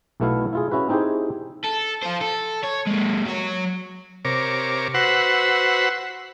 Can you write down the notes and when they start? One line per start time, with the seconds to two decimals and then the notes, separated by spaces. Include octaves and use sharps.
0.20 B1 B2 A3 B3 E4 F5
0.53 E4 F4 G#4
0.71 C#4 E4 F#4 B4
0.89 C4 D#4 E4 G4 G#4 C5
1.65 A4
2.03 F4 C5
2.21 A4
2.64 C#5
2.87 G#3 A#3
3.26 F#3 C#5
4.25 C3 A#4 C#5 D6
4.94 F#4 B4 C5 F#5 E6